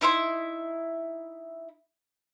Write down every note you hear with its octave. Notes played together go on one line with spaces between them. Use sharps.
D#4 E4 E5 C6